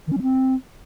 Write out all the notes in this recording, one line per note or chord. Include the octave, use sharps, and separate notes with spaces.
D#3
C#4
F#3
C4